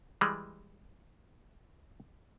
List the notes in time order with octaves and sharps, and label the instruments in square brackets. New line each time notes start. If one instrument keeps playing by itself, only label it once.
[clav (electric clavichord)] E3 G3 G#3